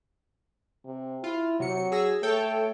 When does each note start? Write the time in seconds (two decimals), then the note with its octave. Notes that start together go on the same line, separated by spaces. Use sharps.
0.86 C3
1.24 E4 F4
1.60 C3 F#3 C#7
1.92 G#4 E6 A#6
2.23 A3 A4 C#5 G5